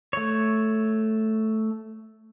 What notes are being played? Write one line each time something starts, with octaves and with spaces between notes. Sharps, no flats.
A3 C#5